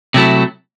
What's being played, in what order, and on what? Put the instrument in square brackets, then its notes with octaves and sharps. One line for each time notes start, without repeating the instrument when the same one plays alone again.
[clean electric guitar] C3 F#3 A3 E4